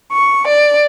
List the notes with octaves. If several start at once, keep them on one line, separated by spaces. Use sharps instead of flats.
C#6
D5